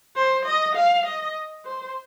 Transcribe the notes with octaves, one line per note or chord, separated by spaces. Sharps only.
C5
D#5
F5
D#5
C5